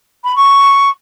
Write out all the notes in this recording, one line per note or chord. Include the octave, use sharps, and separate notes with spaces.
B5
C#6